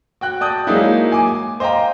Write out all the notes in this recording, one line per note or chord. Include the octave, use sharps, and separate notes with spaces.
F#4 G5 F#6
D5 A5 D#6 G6
F#3 G#3 A#3 D#4 E4
G#5 D6
C5 D#5 F5 G5 A#5